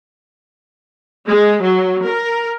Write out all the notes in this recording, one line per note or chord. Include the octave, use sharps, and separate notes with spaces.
G#3
F#3
A#4